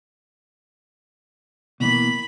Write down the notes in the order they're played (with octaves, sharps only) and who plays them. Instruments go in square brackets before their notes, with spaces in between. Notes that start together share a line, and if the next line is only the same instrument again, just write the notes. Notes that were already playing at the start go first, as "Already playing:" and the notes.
[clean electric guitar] B2 E3 A#3 [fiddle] B5